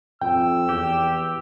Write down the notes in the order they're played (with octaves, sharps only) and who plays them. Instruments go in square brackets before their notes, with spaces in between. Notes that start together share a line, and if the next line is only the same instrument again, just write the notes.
[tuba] F2 [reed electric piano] G5 [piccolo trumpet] E6
[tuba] E2 [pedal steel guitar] G4